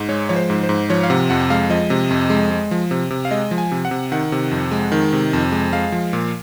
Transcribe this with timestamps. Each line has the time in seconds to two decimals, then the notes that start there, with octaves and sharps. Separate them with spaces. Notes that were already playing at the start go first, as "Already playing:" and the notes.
Already playing: G#2
0.09 G#3 C#5
0.29 F3 C#5
0.36 C5
0.50 G#2
0.63 C5
0.69 G#2
0.90 F3 C#5
1.03 F5
1.10 C3 F#5
1.30 F2 F#5
1.50 G#3 F5
1.70 F3 D#5
1.90 C3
2.10 F2
2.30 G#3
2.51 G#3
2.71 F3
2.91 C3
3.10 C3
3.25 F5
3.31 G#3 D#5
3.51 F3
3.58 G#5
3.72 C3
3.85 F#5
3.91 C3
4.12 D#3 F#5
4.32 C3
4.51 F2
4.72 G#3
4.92 D#3
5.13 C3
5.33 F2
5.52 G#3
5.73 G#3 F5
5.92 F3
6.13 A#2